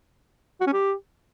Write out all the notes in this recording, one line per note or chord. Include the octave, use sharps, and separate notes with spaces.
F#4
C#4
G4